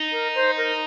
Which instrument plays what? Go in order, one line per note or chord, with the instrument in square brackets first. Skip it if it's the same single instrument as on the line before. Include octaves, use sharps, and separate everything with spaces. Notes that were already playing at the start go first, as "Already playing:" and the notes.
Already playing: [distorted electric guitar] D#4
[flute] A#4
C5
A#4